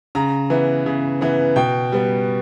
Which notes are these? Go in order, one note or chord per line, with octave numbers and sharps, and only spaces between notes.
C#3 A#5
E3 B3
C#3
E3 B3
B2 G5
G3 B3